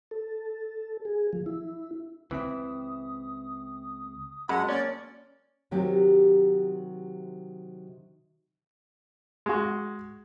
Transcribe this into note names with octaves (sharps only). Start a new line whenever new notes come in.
A4
G#4
F3
E4
C#2 E3 C4 E5 D#6
F#2 G#3 F#5 A5 B5 C6
A#3 C#4 A#4 D5
C3 D#3 F#3 G4
G#3 F#4